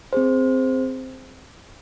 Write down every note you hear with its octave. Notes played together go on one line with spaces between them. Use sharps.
C4 G#4 C5